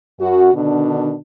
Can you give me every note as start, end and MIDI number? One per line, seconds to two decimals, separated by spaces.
0.20 0.53 42
0.20 0.53 66
0.54 1.15 47
0.54 1.15 50
0.54 1.15 51
0.54 1.15 62